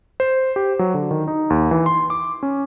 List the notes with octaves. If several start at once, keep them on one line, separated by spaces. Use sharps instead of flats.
C5
G4
F#3
D3
D#3
D#4
D#2
E3
C6
D6
C#4